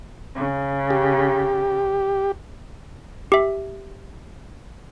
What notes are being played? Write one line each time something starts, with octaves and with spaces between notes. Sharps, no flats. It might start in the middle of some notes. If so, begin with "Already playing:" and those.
C#3
G4
G4 E5